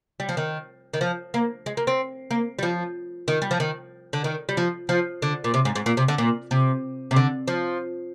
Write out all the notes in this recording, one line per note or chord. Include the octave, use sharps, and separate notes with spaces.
G3
F3
D#3
D#3
F3
A#3
G#3
A#3
C4
A#3
G3
F3
D#3
G3
F3
D#3
D3
D#3
G3
F3
F3
D3
A#2
C3
G#2
G#2
A#2
C3
D3
A#2
C3
C3
D3
F3